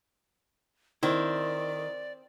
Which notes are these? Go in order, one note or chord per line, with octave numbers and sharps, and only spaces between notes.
D#3 C4 E4 D5